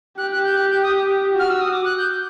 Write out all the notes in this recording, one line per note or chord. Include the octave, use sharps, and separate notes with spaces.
G4 F#6
F#6
G6
G4 F#6
G6
D#6
F#4 F6
E6
D#6
D6
F#6
G6